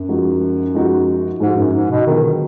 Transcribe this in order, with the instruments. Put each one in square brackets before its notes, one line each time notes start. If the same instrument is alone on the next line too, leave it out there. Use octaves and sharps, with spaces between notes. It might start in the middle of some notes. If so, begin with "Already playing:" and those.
Already playing: [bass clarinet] F#2
[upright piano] F3 G#3 D#4 F#4
F3 G#3 D#4 F#4
[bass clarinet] G#2 [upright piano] F3 G#3 D#4 F#4
[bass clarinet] F#2
G#2
B2
[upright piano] D3 F#3 B3 F4 G#4 [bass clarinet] D#3